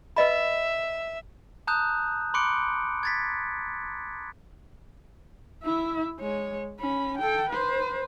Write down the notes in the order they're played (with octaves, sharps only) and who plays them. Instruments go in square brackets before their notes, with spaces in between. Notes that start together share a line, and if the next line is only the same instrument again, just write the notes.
[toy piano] B4 D#5 B5 [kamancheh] E5
[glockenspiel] A5 A#5 D#6 F#6 G6
B5 C6 D6 F#6 C#7 D7
G#6 A6 B6
[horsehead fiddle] E4 E5
G#3 C#5
C#4 B5
A4 G5
B4 C5